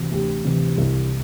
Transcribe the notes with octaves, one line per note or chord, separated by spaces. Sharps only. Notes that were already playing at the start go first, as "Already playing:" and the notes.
Already playing: D2 C3 E3
D2 G4
C3 E3
C2